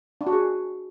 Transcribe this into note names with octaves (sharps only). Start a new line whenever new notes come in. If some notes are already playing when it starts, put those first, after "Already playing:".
D4
F#4
G#4